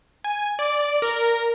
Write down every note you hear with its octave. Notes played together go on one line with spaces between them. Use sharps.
G#5
D5
A#4